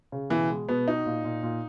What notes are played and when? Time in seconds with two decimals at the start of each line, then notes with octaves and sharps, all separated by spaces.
0.12 C#3
0.30 B2 E3
0.50 G#3
0.69 B2 B3
0.88 D#4 F#4
1.06 A#2
1.24 A#2
1.43 A#2